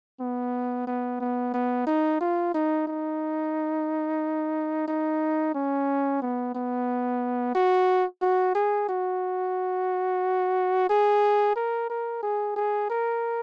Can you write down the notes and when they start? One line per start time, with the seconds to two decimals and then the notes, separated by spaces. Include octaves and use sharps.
0.20 B3
0.87 B3
1.20 B3
1.54 B3
1.87 D#4
2.21 F4
2.54 D#4
2.87 D#4
4.88 D#4
5.54 C#4
6.22 B3
6.55 B3
7.55 F#4
8.22 F#4
8.55 G#4
8.89 F#4
10.89 G#4
11.56 A#4
11.90 A#4
12.23 G#4
12.56 G#4
12.90 A#4